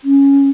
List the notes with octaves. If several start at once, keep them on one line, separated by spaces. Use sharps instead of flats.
C#4